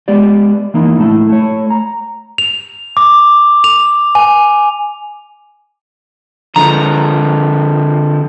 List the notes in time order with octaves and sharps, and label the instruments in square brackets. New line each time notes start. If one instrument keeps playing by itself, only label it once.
[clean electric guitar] G#3 B3 G4 D5
E3 A#3 D#4 E4
B1 A2 A3 E4
A3 C#5
A#5
[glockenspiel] F7
D6
F7
G#5
[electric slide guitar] D3 F3 [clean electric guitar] A#5